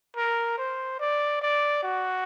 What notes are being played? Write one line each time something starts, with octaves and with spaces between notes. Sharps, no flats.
A#4
C5
D5
D5
F#4